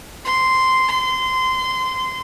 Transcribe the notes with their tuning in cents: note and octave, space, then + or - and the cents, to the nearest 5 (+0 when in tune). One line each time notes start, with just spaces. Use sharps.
C6 -10
C6 -20